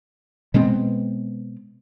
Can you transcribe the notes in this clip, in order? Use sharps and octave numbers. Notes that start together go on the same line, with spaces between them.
B2 G#3 B3 C4